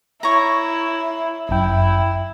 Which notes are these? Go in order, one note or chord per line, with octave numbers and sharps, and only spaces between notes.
E4 C#5 A#5
G1 F#2 E4 G5